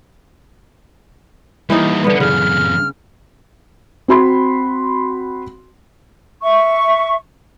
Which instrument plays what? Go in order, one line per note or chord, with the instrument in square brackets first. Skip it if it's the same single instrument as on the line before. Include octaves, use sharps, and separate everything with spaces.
[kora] E3 D#4 [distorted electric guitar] G3 A#3
[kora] D3 B3 [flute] B4
[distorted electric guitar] F#2 E3 [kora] C#3 [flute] F6
[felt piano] C4 F#4 B5 C6
[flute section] E5 C#6